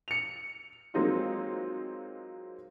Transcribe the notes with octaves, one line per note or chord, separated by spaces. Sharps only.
C#7 F7
F#3 G#3 A#3 C4 D#4 F4